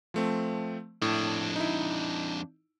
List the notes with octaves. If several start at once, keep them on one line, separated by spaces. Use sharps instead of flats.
F3 A3 C4
F2 A2 D4
D#4 E4